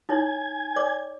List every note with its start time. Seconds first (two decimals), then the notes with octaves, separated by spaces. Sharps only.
0.09 D#4 E4 C#5 G#5
0.76 C#5 D5 D6